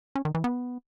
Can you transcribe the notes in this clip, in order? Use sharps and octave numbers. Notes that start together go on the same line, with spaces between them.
C#4
D#3
E3
B3